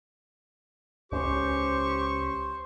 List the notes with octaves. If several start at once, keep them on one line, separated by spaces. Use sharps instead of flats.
C#2 C#4 G4 C5 C#6